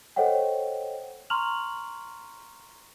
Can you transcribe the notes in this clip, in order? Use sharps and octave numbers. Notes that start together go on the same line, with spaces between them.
A4 C5 C#5 D#5 F#5 G5
A#5 C6 C#6 F6 F7 F#7